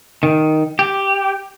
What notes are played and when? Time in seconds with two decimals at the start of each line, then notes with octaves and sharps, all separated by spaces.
0.23 D#3
0.79 G4